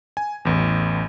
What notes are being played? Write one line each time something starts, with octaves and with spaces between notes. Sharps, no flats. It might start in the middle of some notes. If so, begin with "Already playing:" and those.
G#5
A1 E2